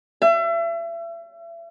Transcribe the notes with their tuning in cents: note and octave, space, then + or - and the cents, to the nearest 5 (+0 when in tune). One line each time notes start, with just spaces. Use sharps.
E5 +35